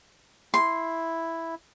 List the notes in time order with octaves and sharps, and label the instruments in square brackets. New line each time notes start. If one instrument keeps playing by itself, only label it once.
[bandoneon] E4 [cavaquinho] C6